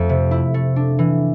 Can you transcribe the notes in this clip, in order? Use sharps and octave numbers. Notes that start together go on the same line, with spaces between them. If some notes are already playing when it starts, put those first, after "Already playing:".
Already playing: F2 F3 A3
C3
E4
A3
D4
E3